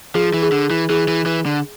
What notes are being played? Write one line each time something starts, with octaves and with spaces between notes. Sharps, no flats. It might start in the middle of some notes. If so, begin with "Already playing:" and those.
F3 G#4
E3
G#4
D3
E3
E3 G#4
E3
E3
D3